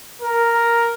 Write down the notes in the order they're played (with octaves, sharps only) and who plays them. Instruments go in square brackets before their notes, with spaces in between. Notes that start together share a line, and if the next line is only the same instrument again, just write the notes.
[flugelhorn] A#4